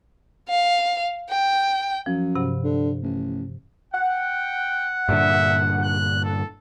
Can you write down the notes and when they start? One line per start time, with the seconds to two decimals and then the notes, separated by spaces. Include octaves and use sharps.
0.49 F5
1.30 G5
2.06 F#2 F3
2.35 G2 C3 F#5
2.64 D3
3.02 A1
3.93 F#5 G5
5.09 G2 A#2 D3 E5
5.83 F#6
6.24 A4